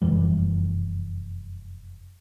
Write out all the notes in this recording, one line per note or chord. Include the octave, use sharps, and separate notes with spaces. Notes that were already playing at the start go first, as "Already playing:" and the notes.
F1 F#2 E3 G3